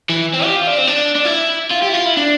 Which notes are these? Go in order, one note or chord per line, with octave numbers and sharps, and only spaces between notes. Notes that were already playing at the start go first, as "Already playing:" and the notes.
E3
C4
G4
F4
D4
C4
D4
D4
E4
F4
G4
E4
F4
E4
D4